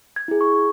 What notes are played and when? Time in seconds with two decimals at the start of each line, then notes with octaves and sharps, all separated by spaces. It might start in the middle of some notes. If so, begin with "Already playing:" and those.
0.16 G#6
0.28 E4 G#4
0.41 C#6